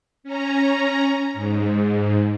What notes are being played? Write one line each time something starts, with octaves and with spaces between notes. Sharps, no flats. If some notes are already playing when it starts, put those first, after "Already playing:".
C#4 A#5
G#2